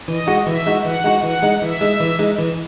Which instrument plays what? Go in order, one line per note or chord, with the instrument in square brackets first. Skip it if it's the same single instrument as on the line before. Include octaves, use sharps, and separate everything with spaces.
[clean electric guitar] E3 [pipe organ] D#5
[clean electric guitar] G#3 D#4 F#4
[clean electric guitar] E3 [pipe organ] E5
[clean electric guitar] G#3 D#4 F#4
[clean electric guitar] E3 [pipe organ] F#5
[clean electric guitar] G#3 D#4 F#4
[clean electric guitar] E3 [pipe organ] F#5
[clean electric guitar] G#3 D#4
[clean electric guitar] E3 [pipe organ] E5
[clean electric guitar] G#3 D#4
E3
G#3 D#4
E3